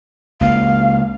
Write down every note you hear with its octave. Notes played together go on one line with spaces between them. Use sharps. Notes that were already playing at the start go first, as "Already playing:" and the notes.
C#2 A#3 F5